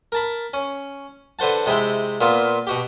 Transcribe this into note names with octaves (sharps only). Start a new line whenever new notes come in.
A#4 A5 B5
C#4
D3 B4 C5 F#5 A5
C3 G#3 E4 G5
A#2 B3 F4
B2 F#4 G4